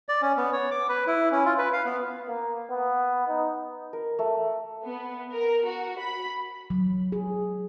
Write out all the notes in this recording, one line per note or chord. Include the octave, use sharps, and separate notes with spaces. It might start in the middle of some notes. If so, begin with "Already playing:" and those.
D5
C#4
B3
C#5
D6
B4
E4
C#4
F4
B4
F5
B3
A#3
B3
D#4
A#4
A3
B3
A#4
F#4
B5
F#3
G#4